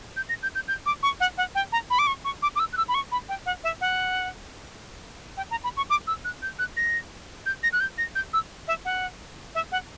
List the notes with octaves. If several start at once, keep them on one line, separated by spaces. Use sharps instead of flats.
G6
A#6
G6
G6
G6
D6
C#6
F#5
F#5
G5
A#5
B5
D6
C#6
C#6
D6
D6
E6
F#6
E6
B5
C#6
B5
G5
F#5
E5
F#5
G5
A#5
B5
C#6
D6
E6
F#6
G6
F#6
A#6
G6
A#6
F#6
G6
A#6
G6
E6
E5
F#5
E5
F#5